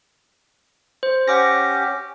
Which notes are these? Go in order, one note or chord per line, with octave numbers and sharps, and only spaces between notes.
C5
C#4 G4 F#5 D6 A#6